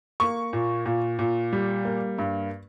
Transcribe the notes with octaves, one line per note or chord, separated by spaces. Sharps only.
A#3 C#6
A#2
A#2
A#2
G3
A#3
G2